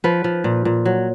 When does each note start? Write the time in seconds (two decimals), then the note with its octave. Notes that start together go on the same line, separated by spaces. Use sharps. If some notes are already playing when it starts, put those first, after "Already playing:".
0.04 F3 B4
0.24 F3
0.44 A#2
0.65 A#2
0.85 F#3